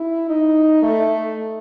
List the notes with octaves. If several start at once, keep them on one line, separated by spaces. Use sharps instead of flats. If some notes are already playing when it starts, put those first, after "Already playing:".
Already playing: E4
D#4
A3